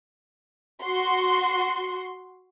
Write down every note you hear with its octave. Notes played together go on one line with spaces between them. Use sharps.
F#4 C6